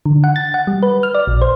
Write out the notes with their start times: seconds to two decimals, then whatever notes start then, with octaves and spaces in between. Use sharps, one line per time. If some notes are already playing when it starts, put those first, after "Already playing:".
0.06 D3
0.24 F#5
0.36 A6
0.54 F#5
0.67 G3
0.83 B4
1.03 F6
1.15 D5
1.27 A#1
1.42 C5